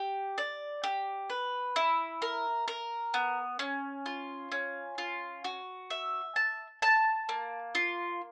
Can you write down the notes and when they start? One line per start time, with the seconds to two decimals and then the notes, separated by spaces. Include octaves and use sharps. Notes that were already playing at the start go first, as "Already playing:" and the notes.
Already playing: G4
0.38 D5
0.84 G4
1.30 B4
1.76 E4
2.22 A#4
2.68 A#4
3.14 B3
3.59 C#4
4.06 F4
4.52 C#4
4.98 F4
5.44 F#4
5.90 E5
6.36 A5
6.82 A5
7.29 A#3
7.75 F4